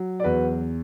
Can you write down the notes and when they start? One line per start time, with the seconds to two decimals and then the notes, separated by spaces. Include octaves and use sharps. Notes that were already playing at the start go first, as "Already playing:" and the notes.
Already playing: F#3
0.20 D5
0.24 E2 F#4 B4